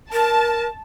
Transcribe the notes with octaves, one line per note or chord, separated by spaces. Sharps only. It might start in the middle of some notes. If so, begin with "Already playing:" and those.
A#4 A5